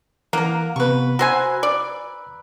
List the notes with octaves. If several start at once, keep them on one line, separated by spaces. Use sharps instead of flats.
E3 A#3 A#4 F#5
C3 B3 B4 C#6
F#4 C5 G#5 A#5 E6
D5